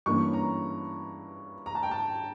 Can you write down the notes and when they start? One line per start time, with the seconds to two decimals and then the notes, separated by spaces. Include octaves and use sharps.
0.06 G2 E3 A#3 C#4 C#6
0.33 A#5
1.66 A#5
1.75 A5
1.83 G5
1.91 A5